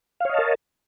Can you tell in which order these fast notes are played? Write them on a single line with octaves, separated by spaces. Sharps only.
F5 C#5 D#5 A5 A#4